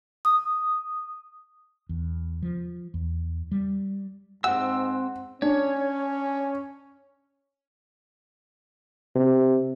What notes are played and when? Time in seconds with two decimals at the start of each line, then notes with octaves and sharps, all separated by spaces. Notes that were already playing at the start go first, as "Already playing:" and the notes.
0.25 D#6
1.89 E2
2.43 F3
2.94 E2
3.52 G3
4.44 G#2 C4 F#5 E6
5.42 C#4 D4 C#5
9.16 C3